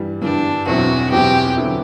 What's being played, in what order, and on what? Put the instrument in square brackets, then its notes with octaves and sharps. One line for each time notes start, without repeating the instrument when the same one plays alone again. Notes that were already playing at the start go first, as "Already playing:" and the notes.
Already playing: [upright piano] G2 E3 G3
[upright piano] G2 E3 G3 [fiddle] D4
[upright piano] E2 B2 F#3 C4 E4 [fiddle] F#4
[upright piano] E2 B2 F#3 C4 E4 [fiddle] G4
[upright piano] D3 F#3 B3 E4